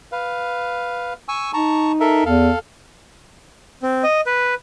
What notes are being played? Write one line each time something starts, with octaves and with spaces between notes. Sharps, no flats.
B4 F5
G#5 C#6 E6
D#4 A5 A#5 C#6
A4 A#4 E5
E2 A4 F5
C4
D#5
B4